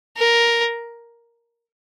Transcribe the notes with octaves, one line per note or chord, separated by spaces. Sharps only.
A#4